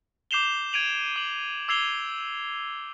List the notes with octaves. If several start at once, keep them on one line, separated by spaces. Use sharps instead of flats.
D6 G6 C7 E7 F7 G7
G#6 D7 D#7 F7 F#7
D6 F#7
D6 E6 G#6 C7 F7 G7